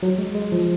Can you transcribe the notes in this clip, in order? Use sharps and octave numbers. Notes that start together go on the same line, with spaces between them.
F#3
G#3
G#3
F3